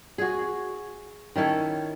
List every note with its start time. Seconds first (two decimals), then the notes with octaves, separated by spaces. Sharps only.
0.18 F#4 G#4
1.36 D#3 C#4 E4 A4